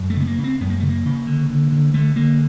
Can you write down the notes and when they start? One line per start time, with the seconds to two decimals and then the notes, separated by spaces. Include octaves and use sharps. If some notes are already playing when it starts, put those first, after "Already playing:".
Already playing: F#2
0.10 A3
0.16 C#3 B3
0.27 A#3
0.38 C#3
0.44 C4
0.61 F#2 B3
0.70 A#3
0.80 C#3 A3
0.89 A#3
1.05 C#3
1.27 D3
1.50 D3
1.72 D3
1.94 D3 A3
2.16 D3 A#3